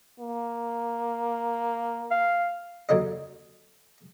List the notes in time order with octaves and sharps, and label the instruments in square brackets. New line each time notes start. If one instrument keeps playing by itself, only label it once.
[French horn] A#3
[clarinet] F5
[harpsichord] D#2 D3 F#3 D#4 D#5